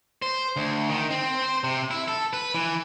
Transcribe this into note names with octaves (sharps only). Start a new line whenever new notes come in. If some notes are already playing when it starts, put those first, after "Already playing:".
C5
D2
D#3
C4
C5
C3
E4
A4
B4
E3